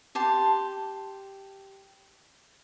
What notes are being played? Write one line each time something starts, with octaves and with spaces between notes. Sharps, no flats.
G4 A5 C6